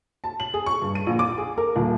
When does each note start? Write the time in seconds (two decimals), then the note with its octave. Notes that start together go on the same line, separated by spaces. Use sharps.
0.24 A5
0.40 F#7
0.54 G#4
0.66 C#6
0.82 G2
0.95 D#7
1.07 A#1
1.19 D6
1.38 G#4
1.58 A#4
1.76 D#1